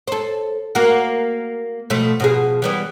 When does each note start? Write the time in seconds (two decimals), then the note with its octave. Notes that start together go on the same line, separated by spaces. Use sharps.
0.07 A4 C5
0.75 A#3 F#4
1.90 B2 F3 A3
2.20 B2 F3 G#4
2.62 E3 G3 B3